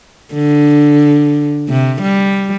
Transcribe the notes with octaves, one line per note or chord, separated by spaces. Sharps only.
D3
C3
G3